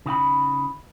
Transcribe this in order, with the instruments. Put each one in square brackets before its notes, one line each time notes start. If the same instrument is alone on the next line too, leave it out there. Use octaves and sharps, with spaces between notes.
[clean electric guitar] C#3 D#4 F#5 B5